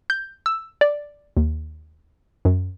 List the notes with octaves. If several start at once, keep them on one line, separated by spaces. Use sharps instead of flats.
G6
E6
D5
D#2
F#2